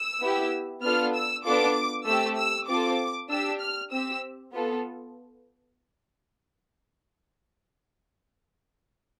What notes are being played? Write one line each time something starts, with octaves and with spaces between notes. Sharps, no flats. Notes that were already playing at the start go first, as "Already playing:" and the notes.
Already playing: E6
B3 E4 G4
B3 D4 F4 A4 F6
E6
B3 D4 F4 A4 D6
A3 C4 G4 E6
E6
C4 F4 A4 D6
D4 G4 E6
F6
C4 G4 E6
B3 F4 A4